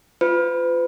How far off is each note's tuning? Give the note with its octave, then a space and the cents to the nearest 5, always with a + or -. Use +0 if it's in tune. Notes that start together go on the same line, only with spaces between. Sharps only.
F4 +0 B4 +40